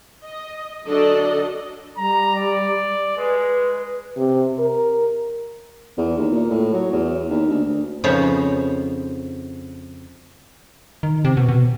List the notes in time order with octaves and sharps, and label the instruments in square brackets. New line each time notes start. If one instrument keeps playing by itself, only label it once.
[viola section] D#5
D3 F#3 D4 A4 D5 D#5
[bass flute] G3 [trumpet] A#5
[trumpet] D5
[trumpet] G#3 [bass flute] B4
[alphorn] C3
A#4
[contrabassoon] E2
D#2
A#2
A2
F#3
E2
D#2
D2
D2
[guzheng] F2 C#3 B3 D#4 C5 C#5
[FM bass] D#3
C3
B2
B2